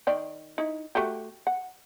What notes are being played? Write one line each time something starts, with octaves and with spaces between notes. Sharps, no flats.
D#3 D5 G5
D#4 E4
A3 F#4 G4
F#5